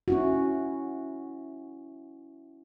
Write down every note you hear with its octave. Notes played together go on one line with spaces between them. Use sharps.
C#4 E4 F#4